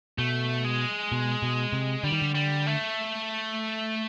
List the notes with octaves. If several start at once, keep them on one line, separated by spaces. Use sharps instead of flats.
B2 A3
G#3
B2
B2
C3
D3 G3
D#3
D3
G3
A3